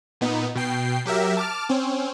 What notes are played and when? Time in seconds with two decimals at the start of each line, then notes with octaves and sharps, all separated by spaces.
0.21 A#2 B3 D#4
0.55 B2 G5 C7
1.06 F#3 G4 A#4 E5
1.37 A5 D6 F6
1.69 C4 C#4